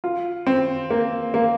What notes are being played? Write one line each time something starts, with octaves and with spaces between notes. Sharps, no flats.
F4
C4
A#3
A#3